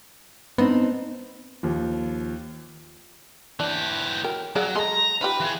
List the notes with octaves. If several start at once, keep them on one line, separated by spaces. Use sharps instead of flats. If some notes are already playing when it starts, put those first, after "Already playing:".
B3 C4 D4 D#4
D#2 F3
E3 D4 G4
F#3 A#4 G5
F#3 G#4 D5 F5
G#3 G#4 A4 A#5 C6
D#4 F4 G4 B4
E3 G#4